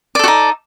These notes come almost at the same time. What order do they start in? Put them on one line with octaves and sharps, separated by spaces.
D5 A4 F#4 D#4